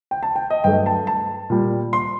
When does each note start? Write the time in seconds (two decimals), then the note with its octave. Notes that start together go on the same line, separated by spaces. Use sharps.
0.11 G5
0.23 A5
0.36 G5
0.50 D#5
0.64 G2 F#3 A3 G5
0.86 A5
1.07 A5
1.50 A#2 G3
1.93 C6